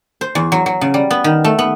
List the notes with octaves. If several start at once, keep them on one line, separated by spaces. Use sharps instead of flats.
C5
E2
F#3
F#3
C#3
G3
B3
D#3
A3
B3